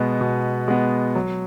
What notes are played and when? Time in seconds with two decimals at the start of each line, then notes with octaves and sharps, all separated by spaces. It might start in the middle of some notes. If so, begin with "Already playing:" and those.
Already playing: B2 G#3 B3
0.21 B2
0.68 G#3 B3
1.15 F#3